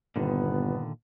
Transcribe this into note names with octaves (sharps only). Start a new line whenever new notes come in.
G1 A#2 D3 D#3 B3